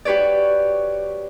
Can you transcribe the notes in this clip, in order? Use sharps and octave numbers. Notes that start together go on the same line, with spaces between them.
F#4 G4 B4 C#5 D5